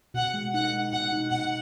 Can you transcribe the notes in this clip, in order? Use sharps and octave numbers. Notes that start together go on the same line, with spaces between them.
B2 F#5
G#3
D#4 F#5
G#3
B2 F#5
D#4
B2 F#5